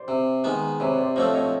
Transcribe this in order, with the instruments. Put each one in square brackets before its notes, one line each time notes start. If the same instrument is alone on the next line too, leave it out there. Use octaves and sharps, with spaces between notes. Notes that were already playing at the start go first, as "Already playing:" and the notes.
Already playing: [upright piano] C5 D5
[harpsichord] C3
D#3 G#3 B3
[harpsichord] C3 [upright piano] B4 C#5
[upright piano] C5 D5
[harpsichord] F3 A3 C4 [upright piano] C#5 D#5
[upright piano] C#5 D#5